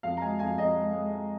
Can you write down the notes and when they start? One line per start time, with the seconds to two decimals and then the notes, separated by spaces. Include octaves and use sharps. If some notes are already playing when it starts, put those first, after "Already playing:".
0.03 F2 F5
0.17 A#5
0.22 G#3 G#5
0.39 F2 G#5
0.58 F2 D#5
0.76 G#3
0.93 G#3
1.11 G#3